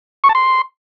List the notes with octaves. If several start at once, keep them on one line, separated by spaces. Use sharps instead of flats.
C#6
A5
C6